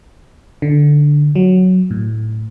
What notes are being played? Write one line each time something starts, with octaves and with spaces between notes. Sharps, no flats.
D3
F#3
A2